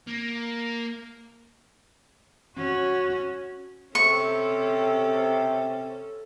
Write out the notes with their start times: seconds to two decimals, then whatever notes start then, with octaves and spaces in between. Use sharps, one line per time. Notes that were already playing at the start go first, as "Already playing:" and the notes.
0.07 A#3
2.57 C#4 F#4
3.95 C3 C#4 A4 C#6